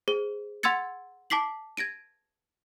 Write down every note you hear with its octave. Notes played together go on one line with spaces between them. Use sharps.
G#4 C5 G7
F#5 C6 E6 G#6 A6 C#7
A5 D6 B6 C7 F#7
G#6 A#6 D7 D#7